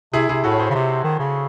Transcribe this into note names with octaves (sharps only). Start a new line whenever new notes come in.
C3 E4 G#4
C3 E4 G#4
A2 F#4 A4
C#5
G#4 C5
C#3
C3
D#3
C#3